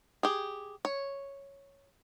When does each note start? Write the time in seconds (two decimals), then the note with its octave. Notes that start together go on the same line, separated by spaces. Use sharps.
0.23 G4 G#4
0.85 C#5